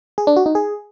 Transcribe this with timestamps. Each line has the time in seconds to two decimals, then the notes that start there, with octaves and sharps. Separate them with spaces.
0.18 G#4
0.27 D4
0.36 F#4
0.46 D#4
0.55 G#4